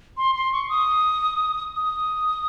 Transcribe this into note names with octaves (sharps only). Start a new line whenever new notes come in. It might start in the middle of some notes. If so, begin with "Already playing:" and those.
C6
C6
C#6
D#6
D#6